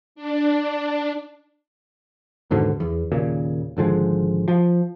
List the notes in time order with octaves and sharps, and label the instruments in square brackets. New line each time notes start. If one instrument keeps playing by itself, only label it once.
[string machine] D4
[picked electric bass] D#2 G#2 B2 D3
E2
D#2 A#2 C#3
G#1 D3 F3 G#3
F3